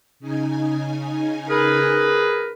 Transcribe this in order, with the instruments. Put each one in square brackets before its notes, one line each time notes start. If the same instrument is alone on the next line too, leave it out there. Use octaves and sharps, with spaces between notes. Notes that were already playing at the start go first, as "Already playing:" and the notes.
[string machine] C#3 D#4 G#5
[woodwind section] G#4 A#4 B4